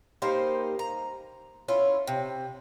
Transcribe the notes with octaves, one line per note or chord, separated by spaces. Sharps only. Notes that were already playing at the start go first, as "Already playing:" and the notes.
G3 A#3 D#4 C5
A#5
C#4 E4 F4
C3